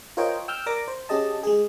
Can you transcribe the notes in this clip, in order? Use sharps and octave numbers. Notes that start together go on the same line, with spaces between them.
F4 A#4 C5 C#5 D#5 G5
G5 E6 F6 G6
A#4 D5 D6 A#6
C5
C#4 G4 G#4 D#5 A5
G#3 G#4